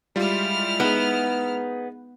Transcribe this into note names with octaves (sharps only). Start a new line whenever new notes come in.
G3 G#3 E4 F4 F6
B3 D#4 G#4